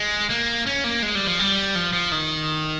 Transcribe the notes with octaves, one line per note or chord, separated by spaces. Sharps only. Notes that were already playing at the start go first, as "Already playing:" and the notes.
Already playing: G#3
A#3
C#4
A#3
G#3
G3
F3
G3
F3
F3
D#3